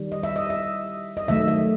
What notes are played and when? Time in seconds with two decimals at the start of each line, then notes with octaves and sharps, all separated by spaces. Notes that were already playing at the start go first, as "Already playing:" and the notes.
Already playing: D#3 G3
0.12 D#5
0.23 E5
0.36 D#5
0.50 E5
1.17 D#5
1.28 D#3 F#3 A3 E5
1.48 E5